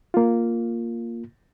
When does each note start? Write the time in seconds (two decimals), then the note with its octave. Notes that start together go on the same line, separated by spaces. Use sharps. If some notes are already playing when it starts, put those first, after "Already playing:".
0.14 A#3 F4